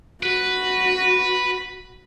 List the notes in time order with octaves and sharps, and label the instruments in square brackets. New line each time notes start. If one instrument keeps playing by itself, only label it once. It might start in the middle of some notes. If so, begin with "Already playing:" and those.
[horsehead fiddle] F#4 [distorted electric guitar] B4